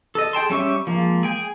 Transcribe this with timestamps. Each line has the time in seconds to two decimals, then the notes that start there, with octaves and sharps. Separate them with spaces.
0.15 A4 D#5
0.33 G#4 G5 A5 C6
0.50 G3 C#4 E5 C#6 D6
0.87 F3 G#3 A#3
1.23 G#4 G5 G#5